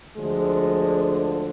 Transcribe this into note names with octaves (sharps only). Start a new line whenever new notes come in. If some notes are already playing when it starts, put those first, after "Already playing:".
D2 D3 F3 G#3